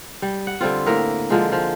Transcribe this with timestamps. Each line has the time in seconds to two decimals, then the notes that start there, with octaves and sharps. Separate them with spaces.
0.22 G3
0.47 F#5
0.61 D3 G3 C4 F4
0.86 A2 A#3 A#4 E5
1.30 D3 F3 G#3
1.52 F3